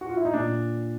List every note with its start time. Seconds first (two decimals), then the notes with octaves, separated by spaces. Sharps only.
0.01 F#4
0.09 F4
0.17 E4
0.25 D#4
0.33 A#2 D4